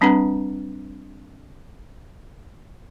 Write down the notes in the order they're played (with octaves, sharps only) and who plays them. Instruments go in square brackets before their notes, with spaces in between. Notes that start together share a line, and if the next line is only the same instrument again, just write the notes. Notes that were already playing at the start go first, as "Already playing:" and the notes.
[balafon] G3 C4 D4 B4 F#5 A#5